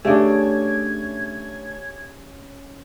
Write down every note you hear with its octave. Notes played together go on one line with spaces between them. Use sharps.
A3 C#4 D4 G4 G#4 E5 G#6